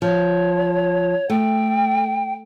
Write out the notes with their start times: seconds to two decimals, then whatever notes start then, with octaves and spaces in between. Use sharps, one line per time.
0.02 F3 C#5
1.30 A3 G5